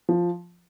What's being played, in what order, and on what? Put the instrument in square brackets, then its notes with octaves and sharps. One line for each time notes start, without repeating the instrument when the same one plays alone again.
[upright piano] F3